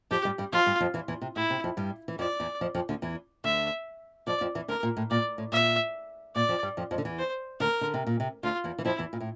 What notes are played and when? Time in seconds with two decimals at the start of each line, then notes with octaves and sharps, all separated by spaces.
0.11 F2 F3 G4
0.25 G2 G3
0.38 G2 G3
0.52 F2 F3 F4
0.66 G2 G3
0.80 F2 F3
0.94 E2 E3
1.08 E2 E3
1.22 C3
1.36 A2 E4
1.50 C3
1.64 F2 F3
1.77 G2 G3
2.08 E3
2.19 F2 F3 D5
2.40 E2 E3
2.61 F2 F3
2.74 F2 F3
2.89 D2 D3
3.02 E2 E3
3.44 D2 D3 E5
4.27 F2 F3 D5
4.41 F2 F3
4.55 E2 E3
4.68 D2 D3 A#4
4.83 A#2
4.97 A2
5.10 A#2 D5
5.38 A2
5.52 A#2 E5
6.35 A#2 D5
6.49 F2 F3
6.63 G2 G3
6.77 F2 F3
6.91 F2 F3
6.98 D3
7.05 E2 E3
7.19 C5
7.60 D2 D3 A#4
7.81 D3
7.94 C3
8.07 A#2
8.20 C3
8.43 D2 D3 F4
8.64 E2 E3
8.79 E3
8.85 F2 F3 E4
8.99 E2 E3
9.13 A#2
9.20 A2